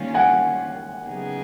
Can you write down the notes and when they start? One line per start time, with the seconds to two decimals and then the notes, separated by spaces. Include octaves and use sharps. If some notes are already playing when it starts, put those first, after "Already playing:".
Already playing: D#3 G3 A#3 C#4 F4
0.14 F#5 G#5
1.07 C#3 F#3 B3 D#4 G#4